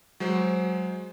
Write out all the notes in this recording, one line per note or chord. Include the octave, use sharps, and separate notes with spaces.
F#3 G#3 C5